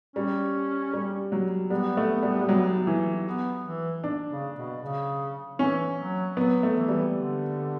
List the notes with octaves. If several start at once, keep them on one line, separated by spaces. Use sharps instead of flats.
G3 C#4
G3
F#3
G3 B3
A3
G3
G3
F#3
E3
B3
E3
D4
C#3
B2
C#3
E3 C#4
F#3
F#3 B3
A3
E3
G3
D3